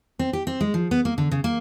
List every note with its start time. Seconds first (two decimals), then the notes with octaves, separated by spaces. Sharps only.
0.19 C4
0.33 G4
0.47 C4
0.61 G#3
0.74 F3
0.91 B3
1.05 A#3
1.18 D3
1.31 C#3
1.44 A#3